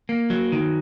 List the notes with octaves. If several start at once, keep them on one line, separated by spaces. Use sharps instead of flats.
A#3
F#3
D#3